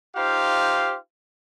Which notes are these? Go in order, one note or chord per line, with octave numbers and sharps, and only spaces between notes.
D#4 F4 G4 C5 F5